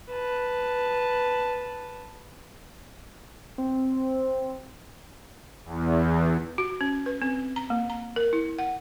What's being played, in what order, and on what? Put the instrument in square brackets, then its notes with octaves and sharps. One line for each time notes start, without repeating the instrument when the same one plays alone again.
[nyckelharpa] B4 A5
[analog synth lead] C4
[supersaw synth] E2
[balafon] F#4
C#4
B4
C4
A#5
A#3
A#5
A#4
E4
F#5